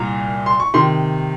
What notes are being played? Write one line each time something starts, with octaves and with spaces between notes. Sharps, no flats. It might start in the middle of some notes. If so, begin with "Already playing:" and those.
Already playing: C2 A#2 A#5
C6
C#6
C3 D#3 C6